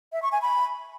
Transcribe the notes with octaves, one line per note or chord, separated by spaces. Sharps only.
E5
C#6
G#5
B5